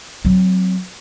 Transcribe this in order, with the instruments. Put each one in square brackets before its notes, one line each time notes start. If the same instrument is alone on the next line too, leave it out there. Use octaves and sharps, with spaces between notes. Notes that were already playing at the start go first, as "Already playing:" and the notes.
[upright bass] F#3 C4